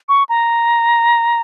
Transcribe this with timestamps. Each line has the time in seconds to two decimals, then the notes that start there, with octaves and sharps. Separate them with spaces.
0.09 C#6
0.29 A#5